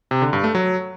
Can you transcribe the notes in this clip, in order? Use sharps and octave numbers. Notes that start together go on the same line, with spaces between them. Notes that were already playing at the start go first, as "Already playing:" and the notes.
C3
D3
G2
A3
F#3